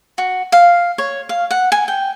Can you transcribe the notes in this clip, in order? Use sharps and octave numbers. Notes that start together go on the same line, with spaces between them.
F#4
F5
C#5
F5
F#5
G#5
G5